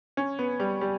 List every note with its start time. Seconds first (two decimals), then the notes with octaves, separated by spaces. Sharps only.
0.17 C#4
0.39 B3
0.60 G3
0.81 G3